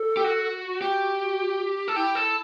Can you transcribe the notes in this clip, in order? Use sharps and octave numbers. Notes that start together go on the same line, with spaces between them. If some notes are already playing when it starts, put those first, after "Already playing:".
Already playing: A4
G4
F#4
F#4 G4
A4
E4 G4
A4